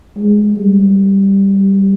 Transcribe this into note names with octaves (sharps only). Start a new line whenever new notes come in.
G#3
G3